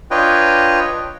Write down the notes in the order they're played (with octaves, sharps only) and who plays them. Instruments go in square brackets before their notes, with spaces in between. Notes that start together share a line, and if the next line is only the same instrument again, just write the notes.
[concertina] D4 F4 B4 C#5 D#5 G5